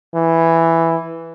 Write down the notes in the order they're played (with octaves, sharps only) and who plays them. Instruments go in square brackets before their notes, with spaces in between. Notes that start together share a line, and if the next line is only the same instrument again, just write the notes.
[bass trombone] E3